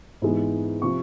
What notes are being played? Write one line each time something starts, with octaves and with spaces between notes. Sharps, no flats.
G#2 E3 G#3 B3
C3 F3 C#6